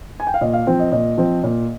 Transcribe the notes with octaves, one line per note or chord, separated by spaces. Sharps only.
G#5
G5
F5
A#2 D#5
F5
F3 C4 G5
D#5
A#2 D#5
F3 C4
A#2